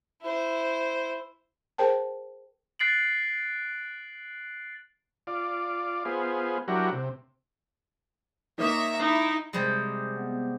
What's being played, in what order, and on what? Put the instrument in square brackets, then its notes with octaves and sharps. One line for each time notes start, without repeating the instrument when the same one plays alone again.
[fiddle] E4 C5
[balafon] G#4 A#4 C5 G5 A5
[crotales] F#6 A6 C7 D7 F#7
[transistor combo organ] F4 D5
B3 F4 G#4 C5
F#3 D4 E4 F#4 G4 A#4
C3
[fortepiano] D#3 A#3 D#6 [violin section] C#5 E5 A#5
[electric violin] D#4 [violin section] E4
[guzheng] C3 G3 G#3
[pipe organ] B3